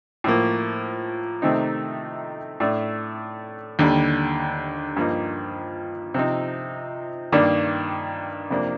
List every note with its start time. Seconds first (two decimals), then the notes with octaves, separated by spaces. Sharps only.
0.24 A2 F3 A#3
1.42 C3 D#3 A3 C4 D#4
2.60 A2 A3 D4
3.79 D#2 D3 G3
4.96 G2 F3 A#3 D#4
6.14 C3 F3 C4 D#4
7.32 G2 D#3 A#3 D4
8.50 F2 C3 F3 A#3 D4